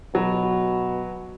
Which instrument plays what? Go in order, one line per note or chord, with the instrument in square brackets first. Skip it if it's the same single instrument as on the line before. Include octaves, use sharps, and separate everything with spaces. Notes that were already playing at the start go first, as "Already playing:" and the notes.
[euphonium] B2 [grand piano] F#3